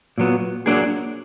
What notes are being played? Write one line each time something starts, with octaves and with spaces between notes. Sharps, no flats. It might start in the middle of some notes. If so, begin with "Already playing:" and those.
A#2 F#3 B3
F#3 A#3 D4 G#4